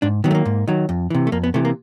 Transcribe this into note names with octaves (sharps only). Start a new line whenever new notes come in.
G#2 D4
D#3 F#3 B3
A3
A#3
G#2
D#3 F#3
F2
C3 E3
A3
F2 A#3
B3
C3 E3 A3
A#3